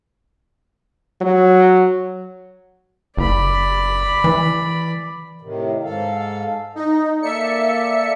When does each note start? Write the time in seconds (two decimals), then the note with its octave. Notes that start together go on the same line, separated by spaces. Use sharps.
1.21 F#3
3.17 F#1 D5 B5
4.24 E3
5.41 A2 C3 D#3
5.83 G#2 A4 F5
6.75 D#4 D#5
7.22 A#3 A4 D5 E5 C#7